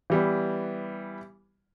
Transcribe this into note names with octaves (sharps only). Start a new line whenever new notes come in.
E3 G3 B3